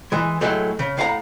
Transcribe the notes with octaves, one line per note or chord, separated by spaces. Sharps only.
E3 G#3
A2 F#3 G#3 A3
C#3
A2 F5 F#5 A#5